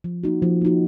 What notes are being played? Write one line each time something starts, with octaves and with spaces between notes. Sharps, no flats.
F3
A#3 D#4 F#4
F3
A#3 D#4 F#4